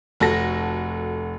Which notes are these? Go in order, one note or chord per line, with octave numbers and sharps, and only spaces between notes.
F1 F#4 A4 A#6